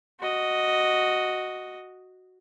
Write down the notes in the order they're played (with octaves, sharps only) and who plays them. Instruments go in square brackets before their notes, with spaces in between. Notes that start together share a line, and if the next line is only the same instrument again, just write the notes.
[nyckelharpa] F#4 D#5